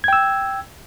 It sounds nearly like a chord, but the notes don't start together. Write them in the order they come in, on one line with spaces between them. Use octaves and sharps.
G#6 G5 E6